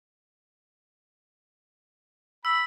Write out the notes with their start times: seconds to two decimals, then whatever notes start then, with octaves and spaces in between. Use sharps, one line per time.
2.45 B5 E6